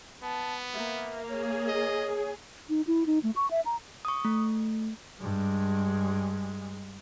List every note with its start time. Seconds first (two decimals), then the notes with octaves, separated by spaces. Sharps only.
0.23 B3 A5
0.74 A#3 E5
1.29 G#4 C#5
1.68 D#5
2.69 D#4
2.87 E4
3.06 D#4
3.23 A3
3.36 C#6
3.51 E5
3.66 A#5
4.05 C#6 D#6
4.25 A3
5.21 G2 G#3